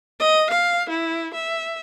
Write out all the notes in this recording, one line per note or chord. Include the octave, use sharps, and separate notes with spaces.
D#5
F5
E4
E5